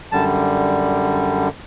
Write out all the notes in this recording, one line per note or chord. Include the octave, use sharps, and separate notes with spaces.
F#2 D3 G3 A5